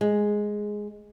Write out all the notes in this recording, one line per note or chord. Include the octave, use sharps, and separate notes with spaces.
G#3